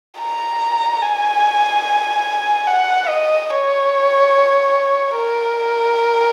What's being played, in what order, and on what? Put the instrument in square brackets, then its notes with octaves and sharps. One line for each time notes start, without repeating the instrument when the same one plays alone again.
[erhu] A#5
G#5
F#5
D#5
C#5
A#4